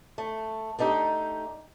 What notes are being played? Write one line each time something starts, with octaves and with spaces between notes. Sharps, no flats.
A3
A3 D4 D#4 G4